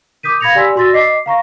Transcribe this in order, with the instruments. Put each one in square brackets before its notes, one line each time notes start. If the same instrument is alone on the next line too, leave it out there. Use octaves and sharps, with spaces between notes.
[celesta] D6 D#6 G6 B6 D#7
F5 B5 G#6 A#6 C#7 F7
G4 D5 G#5 C6 E6 B6
F#4 D5 C6 E6 A6 A#6
D#5 D6 B6 C7
F5 A#5 C#6 A#6